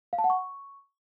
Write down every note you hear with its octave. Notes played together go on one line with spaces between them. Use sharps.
F5
A5
F#5
C#6